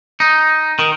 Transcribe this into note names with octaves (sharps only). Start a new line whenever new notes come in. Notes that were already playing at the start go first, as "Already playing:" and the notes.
D#4
D#3